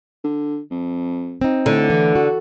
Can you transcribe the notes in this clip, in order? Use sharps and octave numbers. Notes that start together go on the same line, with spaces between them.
D3
F2
C4 D#4
A2 D3
E3
F#4